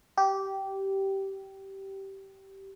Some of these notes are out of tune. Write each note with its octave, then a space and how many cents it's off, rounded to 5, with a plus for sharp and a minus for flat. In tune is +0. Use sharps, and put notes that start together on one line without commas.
G4 -15